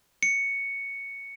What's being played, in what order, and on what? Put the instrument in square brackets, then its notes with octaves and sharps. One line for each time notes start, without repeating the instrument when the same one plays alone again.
[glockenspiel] C#7